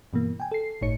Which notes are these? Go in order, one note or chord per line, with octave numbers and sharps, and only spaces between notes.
G2 B2 E3 A#3
G5 G#5
A4 C7
G1 A2 D#4 C#5 C#7